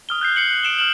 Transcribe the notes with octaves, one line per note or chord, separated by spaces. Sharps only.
D#6 F6 G7
F#6 G6 C7
C7 C#7 F#7
F#6
D7 E7 G7
F6 E7 F#7